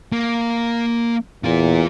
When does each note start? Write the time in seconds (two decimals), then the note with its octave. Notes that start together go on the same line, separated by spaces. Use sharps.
0.12 A#3
1.44 E2 F4 A#4